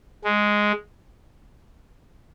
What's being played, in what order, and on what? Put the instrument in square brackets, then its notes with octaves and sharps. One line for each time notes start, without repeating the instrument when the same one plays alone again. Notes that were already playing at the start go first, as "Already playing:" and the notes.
[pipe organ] G#3